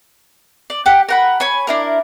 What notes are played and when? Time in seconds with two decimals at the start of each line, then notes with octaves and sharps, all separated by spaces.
0.70 D5
0.86 G4 F#5
1.09 A#4 F#5 B5
1.40 C#5 G#5 B5
1.67 D4 E4 A#4